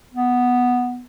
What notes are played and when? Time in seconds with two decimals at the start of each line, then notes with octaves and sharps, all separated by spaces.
0.13 B3